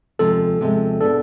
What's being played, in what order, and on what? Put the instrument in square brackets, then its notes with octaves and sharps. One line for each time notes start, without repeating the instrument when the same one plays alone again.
[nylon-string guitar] C3 F3 G#3 [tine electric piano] A4
[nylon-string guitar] C3 F3 G#3
[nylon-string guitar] B2 B3 D4 [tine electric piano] A4